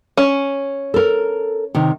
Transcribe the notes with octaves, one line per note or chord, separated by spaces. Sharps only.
C#4
A4 A#4
C3 D#3